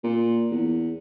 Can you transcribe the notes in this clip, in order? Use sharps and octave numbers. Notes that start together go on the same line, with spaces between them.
A#2
E2